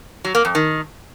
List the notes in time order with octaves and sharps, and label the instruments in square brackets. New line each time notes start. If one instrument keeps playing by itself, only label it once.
[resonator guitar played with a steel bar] F#3
A#3
F2
D#3